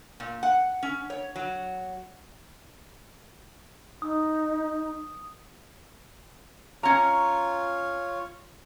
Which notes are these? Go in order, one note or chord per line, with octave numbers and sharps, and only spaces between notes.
A#2
F#5
C#4
C#5
F#3
D#4 D#6
C#4 F4 C#5 A#5